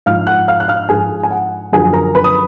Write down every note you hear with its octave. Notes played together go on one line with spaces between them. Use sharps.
G#2 F3 F5 F6
F#5 F#6
F5 F6
F#6
F5 F6
G#2 F3 G#4 G#5
G#5
F#5
F#2 D3 F3 G#4 G#5
A#4 A#5
B4 B5
D#6